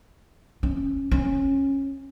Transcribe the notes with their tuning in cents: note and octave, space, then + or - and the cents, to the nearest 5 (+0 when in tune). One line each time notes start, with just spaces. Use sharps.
C#4 -15
C#4 -20